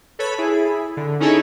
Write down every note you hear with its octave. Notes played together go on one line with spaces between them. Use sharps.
A4 B4 C#5 B5
E4 G#4
D3
C#4 D#4 E4 G#4 A4 C#5